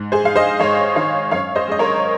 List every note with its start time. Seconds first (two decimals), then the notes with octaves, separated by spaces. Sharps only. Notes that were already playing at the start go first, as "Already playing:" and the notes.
Already playing: G#2
0.12 G#4 C5
0.24 G#3 F5
0.36 C5 D#5
0.59 G#2 C#5 F5
0.96 D#3 C#5 F5
1.31 F#2 C#5 F5
1.55 C5 D#5
1.68 G#3 D#5
1.79 A#4 C#5